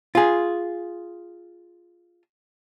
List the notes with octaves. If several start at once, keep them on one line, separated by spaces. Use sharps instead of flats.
F4 G#4